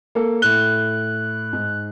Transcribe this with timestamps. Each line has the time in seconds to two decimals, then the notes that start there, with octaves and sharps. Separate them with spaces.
0.15 A#3 A4
0.42 A2 F#6 G7
1.53 G#2